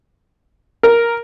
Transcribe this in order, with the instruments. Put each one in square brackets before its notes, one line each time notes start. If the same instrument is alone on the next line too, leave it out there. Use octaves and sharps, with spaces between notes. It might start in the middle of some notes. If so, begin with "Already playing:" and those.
[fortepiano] A#4